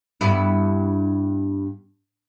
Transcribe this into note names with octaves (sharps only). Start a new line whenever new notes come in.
G2 B3 E4